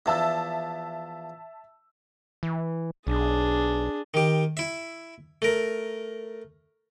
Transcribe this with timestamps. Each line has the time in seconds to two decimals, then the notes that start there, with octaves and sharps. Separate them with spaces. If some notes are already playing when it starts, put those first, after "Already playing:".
0.06 E2 F3 E5 A5 E6
2.43 E3
3.07 B1 D4 G#4
4.14 D#3 G4
4.57 E4 E5
5.42 A3 A#4